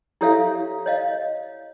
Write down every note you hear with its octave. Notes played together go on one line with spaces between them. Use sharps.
E4 G4 A4 C#5 E5 F5
C#5 D#5 F5